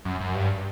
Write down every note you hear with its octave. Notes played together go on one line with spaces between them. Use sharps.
F#2
F#2
G2